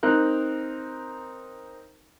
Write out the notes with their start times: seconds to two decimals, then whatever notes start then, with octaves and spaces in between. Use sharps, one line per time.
0.03 C4 D#4 A#4 F#6